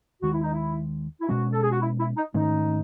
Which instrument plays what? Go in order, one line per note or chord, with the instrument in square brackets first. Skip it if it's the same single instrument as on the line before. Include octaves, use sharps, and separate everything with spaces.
[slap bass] D#2 D#3 G#3 [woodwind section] F#4
[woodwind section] E4
D#4
E4
E4
[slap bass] B2 G#3 C#4 [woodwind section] F#4
[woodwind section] A4
G#4
F#4
E4
E4
D#4
[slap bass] G#2 D#3 A3 C#4 [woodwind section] D#4